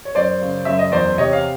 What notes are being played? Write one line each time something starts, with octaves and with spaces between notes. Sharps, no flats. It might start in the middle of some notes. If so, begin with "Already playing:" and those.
C#5
F#2 C5 D5
C#3
F#2 E5
D#5
E2 C5 D5
C3 C#5 D#5
F5